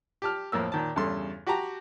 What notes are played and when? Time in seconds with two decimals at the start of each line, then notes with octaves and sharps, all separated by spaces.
0.22 G4 A5 F6
0.52 F2 A2 A#3 E6
0.72 A#2 D#3 A5
0.96 E2 G2 C#3 A4 C6
1.47 F#4 G4 G5 A5 A#5